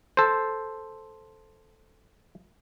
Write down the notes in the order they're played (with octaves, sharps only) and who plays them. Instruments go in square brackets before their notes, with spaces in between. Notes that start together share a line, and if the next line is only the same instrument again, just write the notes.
[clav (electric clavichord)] A4 C5